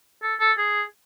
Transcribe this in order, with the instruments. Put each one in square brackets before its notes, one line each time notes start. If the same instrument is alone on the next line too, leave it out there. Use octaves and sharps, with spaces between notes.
[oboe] A4
A4
G#4